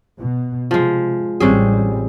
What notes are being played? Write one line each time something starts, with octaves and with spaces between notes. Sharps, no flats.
B2
C3 F3 G#3
A1 C3 E3 G3 C#4 G#4